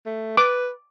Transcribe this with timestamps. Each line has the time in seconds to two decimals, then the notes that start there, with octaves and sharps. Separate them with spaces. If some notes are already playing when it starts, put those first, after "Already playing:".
0.06 A3
0.37 B4 D6